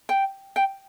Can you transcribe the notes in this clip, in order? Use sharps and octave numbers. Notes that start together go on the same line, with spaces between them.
G5
G5